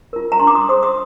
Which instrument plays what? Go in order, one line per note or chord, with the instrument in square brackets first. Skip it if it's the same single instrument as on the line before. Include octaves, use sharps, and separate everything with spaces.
[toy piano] F4 A#4
A#5
D4 C6
D6
C6 D#6
G#4 C5 C6 D#6
C6 D#6